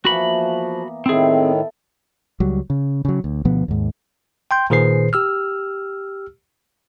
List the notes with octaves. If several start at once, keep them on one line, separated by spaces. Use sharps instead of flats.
E3 F3 A#3 B3 F#4 B5
A2 D#3 C4 E4 G#4 A4 G5
C#2 F#3 G3
C#3
C#3 F#3
D2
D2 B2 F3 B3
D#2 G#2
G5 C6 G6
A#2 D#3 G#4 B4 C5 C7
G4 E6 F6